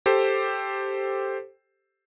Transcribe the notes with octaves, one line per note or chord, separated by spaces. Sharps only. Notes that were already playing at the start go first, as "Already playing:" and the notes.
G4 A4 C5